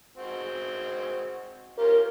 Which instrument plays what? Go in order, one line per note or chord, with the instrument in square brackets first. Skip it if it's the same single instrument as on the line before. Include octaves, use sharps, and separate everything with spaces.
[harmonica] G#3 C4 F#4
[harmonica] C#4 F4 G4 [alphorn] A#4